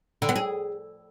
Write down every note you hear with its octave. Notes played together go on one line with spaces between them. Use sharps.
D3
B3
G#4